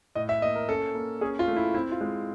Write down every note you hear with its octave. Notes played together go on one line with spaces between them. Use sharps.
A2 D#5
E5
A#3 D#5
A#4
C#4 A4
A#3
C#4 G#4
F4
A3
E4
C4 E4
F4
G#3